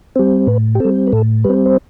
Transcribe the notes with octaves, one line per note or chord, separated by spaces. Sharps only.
G3 C4
A2 B4
G4
G3 C4 A4
B4
A2 A4
G3 C4 B4
C5